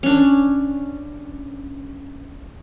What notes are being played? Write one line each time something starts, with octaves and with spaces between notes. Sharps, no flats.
C#4 D4